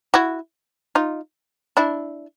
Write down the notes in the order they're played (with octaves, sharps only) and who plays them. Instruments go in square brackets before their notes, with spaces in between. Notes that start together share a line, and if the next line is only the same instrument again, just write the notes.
[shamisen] E4 F#4
D#4 F4
D4 E4